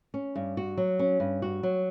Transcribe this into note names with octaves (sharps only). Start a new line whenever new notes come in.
C#4
G2
F#4
F#3
C#4
G2
F#4
F#3